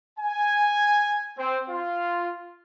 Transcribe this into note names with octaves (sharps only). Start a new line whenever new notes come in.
G#5
C4
F4